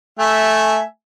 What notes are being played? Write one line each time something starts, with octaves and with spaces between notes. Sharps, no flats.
A3 E5 G#5